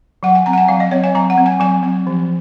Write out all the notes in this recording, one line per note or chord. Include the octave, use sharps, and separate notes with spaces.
F#3 F#5
G#5
C4 A#5
F#5
G#5
F#3 F5
D#5
C4 C#5
G#5
F#3 A#5
F#5
C4
G#5
F#3 G#5
C4
F3